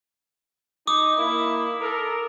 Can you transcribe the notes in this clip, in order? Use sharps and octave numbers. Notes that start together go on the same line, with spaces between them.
D#4 D6 D#6
A#3 E4
A4 A#4